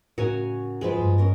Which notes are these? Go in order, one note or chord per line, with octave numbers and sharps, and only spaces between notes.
A2 C#3 F#4 A#4 C#5 G#5
G#2 F3 G#3 B4
G2
C#4 A#4